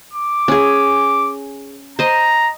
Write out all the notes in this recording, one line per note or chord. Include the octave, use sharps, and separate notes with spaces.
D6
C#4 G#4
C5 D#5 A#5